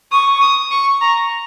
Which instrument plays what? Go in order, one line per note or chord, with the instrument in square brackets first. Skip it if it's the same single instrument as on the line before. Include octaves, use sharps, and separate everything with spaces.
[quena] C#6 [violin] D#6
[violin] D#6
C#6
[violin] A#5 [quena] C#6